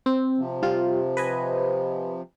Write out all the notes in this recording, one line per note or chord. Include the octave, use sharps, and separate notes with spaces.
C4
C3 F3
G3 F4
B4 D#5 G#5